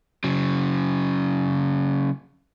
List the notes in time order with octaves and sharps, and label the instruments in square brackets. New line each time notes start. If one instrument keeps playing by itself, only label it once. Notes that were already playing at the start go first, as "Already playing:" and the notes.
[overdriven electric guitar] C#3 F#3